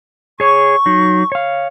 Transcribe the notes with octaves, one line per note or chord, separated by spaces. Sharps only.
G#4 C#5 C#6
F#3 D#4
C#5 F5